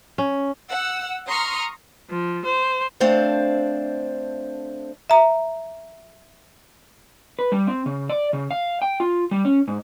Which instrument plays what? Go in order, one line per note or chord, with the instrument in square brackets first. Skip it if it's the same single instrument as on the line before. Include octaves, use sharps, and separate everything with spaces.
[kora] C#4
[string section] F#5 E6
A#5 C6 C#6 D#6 F6
[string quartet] F3
C5
[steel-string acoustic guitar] A3 C4 D4 C5 F5
[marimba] E5 A#5
[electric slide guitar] B4
G3
C4
C#3
D5
C#3
F5
G5
F4
G3
C#4
G#2